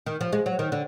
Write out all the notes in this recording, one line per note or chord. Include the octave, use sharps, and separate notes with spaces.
D#3
F3
G#3
F#3
D#3
D3